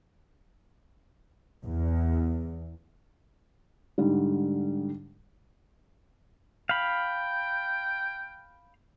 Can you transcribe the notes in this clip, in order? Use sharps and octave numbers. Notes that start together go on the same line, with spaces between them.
E2
G#2 D3 G3
F5 G5 B5